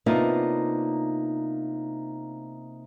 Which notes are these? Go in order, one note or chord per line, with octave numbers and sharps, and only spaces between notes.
C3 A#3 B3 D4 D#4 F4